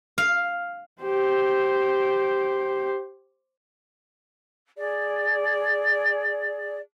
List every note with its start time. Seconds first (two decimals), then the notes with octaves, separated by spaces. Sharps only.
0.18 F5
1.02 G4 C5
4.76 G#4 D5